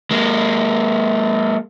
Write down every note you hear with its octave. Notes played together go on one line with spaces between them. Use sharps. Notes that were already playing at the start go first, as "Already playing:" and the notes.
G#3 A#3